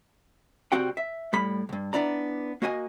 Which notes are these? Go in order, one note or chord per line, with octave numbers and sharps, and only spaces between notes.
C2 D3 G3 C4 F#4 G5
E5
A2 G3 B5
C#2 G2
B3 D4 E4 D5 A#5
A#3 F#4 D#5 E5 G#5